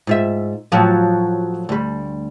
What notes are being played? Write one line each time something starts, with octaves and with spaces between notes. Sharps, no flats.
G#2 F4 E5
A2 F3 F#3
D2 G3